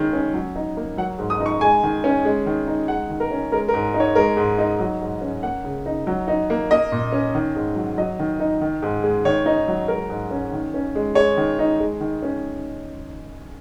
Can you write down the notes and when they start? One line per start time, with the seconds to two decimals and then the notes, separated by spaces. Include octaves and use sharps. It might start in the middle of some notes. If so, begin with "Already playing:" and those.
Already playing: D#3 G#3 C#4
0.13 C#4
0.34 F#3
0.56 D#4
0.77 A#3
0.97 F#3 F#5
1.18 G#2
1.30 D#6
1.40 D#4
1.46 C#6
1.61 G#3 G#5
1.83 D#3
2.04 C#4
2.25 G#3
2.46 D#3
2.67 D#4
2.88 G#3 F#5
3.10 D#3
3.20 A#4
3.31 C#4
3.52 G#3 A#4
3.68 A#4
3.74 G#2
3.94 D#4
4.00 C#5
4.15 G#3 A#4
4.37 G#2
4.59 D#4
4.80 F#3
5.01 G#2
5.22 C#4
5.43 A#3 F#5
5.64 C#3
5.86 D#4
6.07 F#3
6.28 D#4
6.50 A#3
6.71 A#3 D#5
6.92 A#2
7.12 C#4
7.35 D#3
7.56 G#2
7.76 F#3
7.98 F#3 D#5
8.19 D#3
8.40 D#4
8.61 D#3
8.82 G#2
9.03 G#3
9.25 D#3 C#5
9.46 D#4
9.68 F#3
9.88 G#3 A#4
10.10 G#2
10.31 C#4
10.53 D#3
10.74 C#4
10.95 G#3
11.15 G#3 C#5
11.37 D#3
11.59 D#4
11.80 G#3
12.01 D#3
12.22 C#4